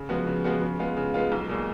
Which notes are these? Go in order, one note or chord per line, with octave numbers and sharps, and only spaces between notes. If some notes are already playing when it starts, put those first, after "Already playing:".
Already playing: C#3
F3 G#3 B3 F#4
C#3
F3 G#3 B3 F#4
C#3
G#3 B3 F4
C#3
G#3 B3 F4
B1
A#2 G#3